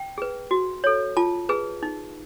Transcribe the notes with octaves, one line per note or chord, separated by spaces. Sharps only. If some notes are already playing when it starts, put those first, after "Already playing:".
Already playing: G5
G#4 B4
F#4
A4 C#5
F4 A5
G#4 B4
D#4